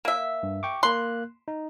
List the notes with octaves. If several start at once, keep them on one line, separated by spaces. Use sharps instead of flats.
A#3 E5
G2
G5 C#6 D6
A#3 C6 F#6
D#4